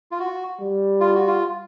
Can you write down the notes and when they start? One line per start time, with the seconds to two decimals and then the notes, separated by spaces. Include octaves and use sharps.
0.12 F4
0.19 F#4
0.60 G3
1.01 F4
1.15 F#4
1.27 F4